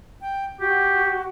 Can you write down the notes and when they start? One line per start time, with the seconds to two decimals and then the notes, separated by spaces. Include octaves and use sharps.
0.21 G5
0.60 F#4 G4